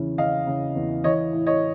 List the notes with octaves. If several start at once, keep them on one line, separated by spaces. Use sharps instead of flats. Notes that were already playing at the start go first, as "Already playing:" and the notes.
Already playing: E2 C#3 E3
C#3 D#5 F5
C#3
E2
E3 C#5 D#5
A2
C#5 D#5